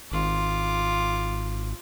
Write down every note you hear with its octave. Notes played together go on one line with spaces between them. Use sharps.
G#1 F4 D6